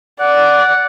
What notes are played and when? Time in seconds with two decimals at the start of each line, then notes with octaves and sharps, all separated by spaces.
0.20 D5 F#5